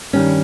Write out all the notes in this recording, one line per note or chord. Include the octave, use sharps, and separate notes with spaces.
G2 D#3 G3 C#4